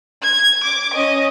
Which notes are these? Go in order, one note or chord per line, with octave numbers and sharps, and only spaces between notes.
G#6
D6
C#4 D#5